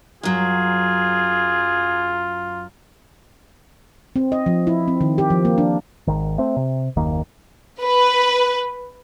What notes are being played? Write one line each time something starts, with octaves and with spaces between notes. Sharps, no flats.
F#2 F#3 F4 G#4
C4
D#5
F3
E4
C4
D#3
G4
F3
A#3
D4
G#1 D#3
A3 C4
C3
F#1 D#2 D#3 A#3
B4